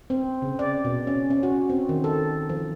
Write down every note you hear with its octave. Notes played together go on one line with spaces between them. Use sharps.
C4
C#3
D5
B2
C#4
C#4
F#4
C4
D#3
A4
F3